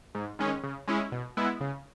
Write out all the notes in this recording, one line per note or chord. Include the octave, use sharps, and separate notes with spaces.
G#2
D#3 G#3 C#4
C#3
G#3 C#4 E4
B2
G#3 B3 E4
C#3